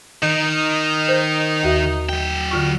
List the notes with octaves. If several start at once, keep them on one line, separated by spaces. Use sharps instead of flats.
D#3 D#4
C5 G6
D#2 F#4 E5
F#3 G5
D3 F4 C#6